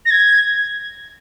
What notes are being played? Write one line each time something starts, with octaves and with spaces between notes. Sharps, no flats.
A#6
G#6